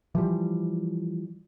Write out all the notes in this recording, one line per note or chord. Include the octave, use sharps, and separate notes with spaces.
E3 F3 G3